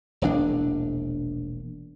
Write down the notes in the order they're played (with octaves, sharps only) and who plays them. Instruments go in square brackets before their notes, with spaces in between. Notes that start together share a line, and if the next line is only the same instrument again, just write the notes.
[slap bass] E1 A#1 D4